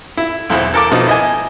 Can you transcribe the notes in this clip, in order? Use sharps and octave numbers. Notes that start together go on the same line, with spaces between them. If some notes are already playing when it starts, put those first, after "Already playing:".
E4
B1 E2 E4 C5
A4 A#4 A5 D6
B2 F3 D#4
E4 D#5 G#5